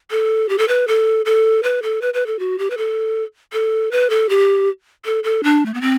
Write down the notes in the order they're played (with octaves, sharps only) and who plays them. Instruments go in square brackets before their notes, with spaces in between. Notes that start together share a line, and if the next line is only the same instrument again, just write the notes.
[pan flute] A4
G4
A4
B4
A4
A4
B4
A4
B4
B4
A4
F#4
G4
B4
A4
A4
B4
A4
G4
A4
A4
D4
A3
B3
C4